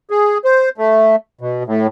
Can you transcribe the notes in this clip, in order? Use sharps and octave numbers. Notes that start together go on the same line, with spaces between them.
G#4
C5
A3
B2
A2